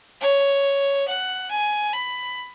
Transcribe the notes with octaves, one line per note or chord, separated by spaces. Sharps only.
C#5
F#5
G#5
B5